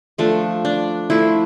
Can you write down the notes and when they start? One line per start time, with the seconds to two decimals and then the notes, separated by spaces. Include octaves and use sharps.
0.18 F3 A3 D4
0.65 D4
1.10 F3 A3 D4 E4